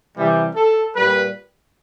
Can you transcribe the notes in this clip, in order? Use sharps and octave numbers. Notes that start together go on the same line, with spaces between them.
C3 E3 G3
A4
A#2 G3 B4